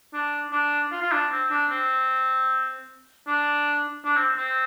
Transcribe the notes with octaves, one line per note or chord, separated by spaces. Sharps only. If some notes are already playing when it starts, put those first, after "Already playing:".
D4
D4
F4
F4
D4
C4
D4
C4
D4
D4
C4
C4